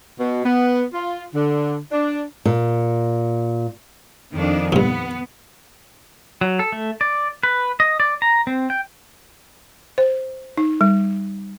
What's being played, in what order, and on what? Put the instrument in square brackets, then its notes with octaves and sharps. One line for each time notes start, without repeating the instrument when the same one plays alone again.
[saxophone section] B2
B3
F4
D3
D4
[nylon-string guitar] A#2
[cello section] F2 D#3 D4
[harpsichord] G2 A#2 [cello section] B3
[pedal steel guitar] F#3
A4
A3
D5
B4
D#5
D5
A#5
C4
G5
[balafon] C5
D#4
G3